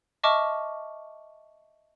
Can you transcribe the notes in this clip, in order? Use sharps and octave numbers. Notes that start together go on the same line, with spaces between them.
D#5 E5 A5 C#6 D6 F6